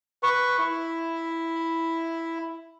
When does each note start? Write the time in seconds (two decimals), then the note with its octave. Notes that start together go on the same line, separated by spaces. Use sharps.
0.23 B4 C#6
0.59 E4